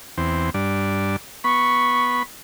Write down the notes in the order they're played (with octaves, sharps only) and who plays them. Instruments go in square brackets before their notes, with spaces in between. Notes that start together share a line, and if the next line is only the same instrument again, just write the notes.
[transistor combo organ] E2 C4
G2 D4
[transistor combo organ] B3 B5 [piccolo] C#6